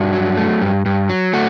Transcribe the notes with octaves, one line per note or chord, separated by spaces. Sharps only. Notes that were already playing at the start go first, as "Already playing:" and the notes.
Already playing: G2 D4 F#4
F#3
A3
G2
G2
F#3
A3 F#4